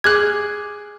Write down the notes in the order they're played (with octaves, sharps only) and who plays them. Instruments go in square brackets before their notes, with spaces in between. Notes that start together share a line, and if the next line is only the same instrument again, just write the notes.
[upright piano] G#4 D6 F6 [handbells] F#6 G#6